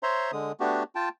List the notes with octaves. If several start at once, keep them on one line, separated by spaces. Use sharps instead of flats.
C5 C#5 E5 A#5 C6
D3 G#3 D#6
A3 B3 D4 F#4 G4
F4 G5 A5